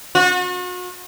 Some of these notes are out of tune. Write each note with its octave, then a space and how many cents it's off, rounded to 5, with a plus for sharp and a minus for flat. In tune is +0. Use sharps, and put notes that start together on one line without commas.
F#4 -40